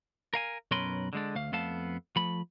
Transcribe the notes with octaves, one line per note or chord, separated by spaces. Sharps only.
A#4 F5 G#5
B1 F#2 C#4 A#4 B4 C6
D3 G#3 D4
D2 A3 F5
F2 A3 B3 A4 F5 A5
F3 A3 B5